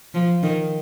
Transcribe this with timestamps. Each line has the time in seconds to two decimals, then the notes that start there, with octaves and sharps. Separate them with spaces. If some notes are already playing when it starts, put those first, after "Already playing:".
0.14 F3
0.43 D#3